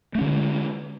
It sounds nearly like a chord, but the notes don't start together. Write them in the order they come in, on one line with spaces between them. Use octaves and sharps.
A3 C#4 D3 G#3